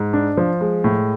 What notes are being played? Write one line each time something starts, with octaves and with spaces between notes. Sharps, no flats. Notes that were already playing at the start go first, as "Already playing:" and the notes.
Already playing: G#2
D4
F3
G#3
A2